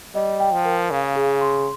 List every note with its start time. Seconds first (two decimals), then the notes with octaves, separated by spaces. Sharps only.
0.15 G3 D#5
0.40 G5
0.53 F3
0.65 A#4
0.91 C#3 F5
1.16 G#4
1.41 C6